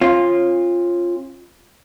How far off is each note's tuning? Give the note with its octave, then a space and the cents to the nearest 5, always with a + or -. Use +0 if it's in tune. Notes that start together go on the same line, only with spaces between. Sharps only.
C#4 -40 F4 +0